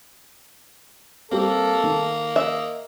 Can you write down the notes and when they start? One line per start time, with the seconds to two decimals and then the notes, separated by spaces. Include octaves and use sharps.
1.32 G3 A#3 C4 A4
1.84 D#3
2.36 D#5 E5